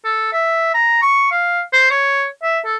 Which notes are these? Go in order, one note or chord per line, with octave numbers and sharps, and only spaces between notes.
A4
E5
A#5
C#6
F5
C5
C#5
E5
A4